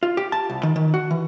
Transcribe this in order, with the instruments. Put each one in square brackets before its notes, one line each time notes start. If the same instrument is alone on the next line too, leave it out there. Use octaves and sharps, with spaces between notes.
[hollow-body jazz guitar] F4
G4
A5
C2
D#3
D#3
F#4
E3